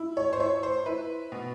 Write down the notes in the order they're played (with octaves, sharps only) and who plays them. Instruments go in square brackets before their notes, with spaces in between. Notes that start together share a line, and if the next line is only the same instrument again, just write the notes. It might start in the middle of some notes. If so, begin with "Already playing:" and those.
Already playing: [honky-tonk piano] E4
C#5
C5
E4 C#5
C5
E4 B4
B2